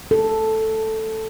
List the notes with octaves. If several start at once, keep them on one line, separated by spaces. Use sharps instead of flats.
A4